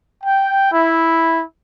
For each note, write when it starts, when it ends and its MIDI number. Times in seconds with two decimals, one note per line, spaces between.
0.24 0.71 79
0.72 1.43 64